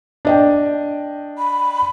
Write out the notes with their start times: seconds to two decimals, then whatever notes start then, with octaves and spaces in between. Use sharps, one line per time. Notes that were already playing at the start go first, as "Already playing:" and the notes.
0.25 D4 D#5 G5
1.38 B5